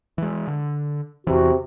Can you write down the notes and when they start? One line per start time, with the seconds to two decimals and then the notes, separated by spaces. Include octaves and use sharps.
0.18 E3 G#3
0.48 D3
1.27 E2 C3 E3 F#4